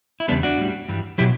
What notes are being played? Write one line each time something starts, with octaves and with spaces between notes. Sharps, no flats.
E4
E2 C#3 G3 B3 D4
D4 F#4
A2 G3
G2 E3 G3
B2 F#3 E4 G4